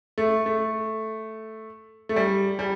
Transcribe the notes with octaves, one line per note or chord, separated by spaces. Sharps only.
A3
A3
A3
G3
G3